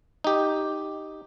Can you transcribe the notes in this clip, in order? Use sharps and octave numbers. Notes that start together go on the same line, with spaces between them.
D#4 G4